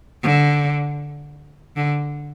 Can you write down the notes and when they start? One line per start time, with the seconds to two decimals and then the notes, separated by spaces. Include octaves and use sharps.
0.23 D3
1.76 D3